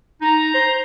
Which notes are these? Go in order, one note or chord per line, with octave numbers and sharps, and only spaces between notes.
D#4 A#5
C5